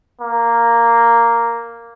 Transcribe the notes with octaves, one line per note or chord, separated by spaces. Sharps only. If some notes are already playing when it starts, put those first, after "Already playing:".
A#3